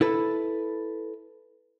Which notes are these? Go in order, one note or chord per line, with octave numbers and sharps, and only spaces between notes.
E4 A4 B4